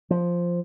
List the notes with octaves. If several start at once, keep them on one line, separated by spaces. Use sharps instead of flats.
F3